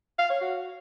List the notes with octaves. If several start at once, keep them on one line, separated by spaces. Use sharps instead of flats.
F5
C#5
F#4